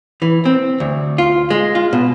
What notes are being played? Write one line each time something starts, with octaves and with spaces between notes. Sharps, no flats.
E3
C4
D2
F4
G#3
F4
B2